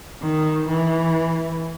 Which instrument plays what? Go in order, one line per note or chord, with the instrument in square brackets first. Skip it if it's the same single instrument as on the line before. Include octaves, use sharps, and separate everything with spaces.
[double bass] D#3
E3